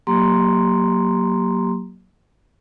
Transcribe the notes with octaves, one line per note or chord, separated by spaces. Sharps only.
F#3 A#3 G4 A#5 C6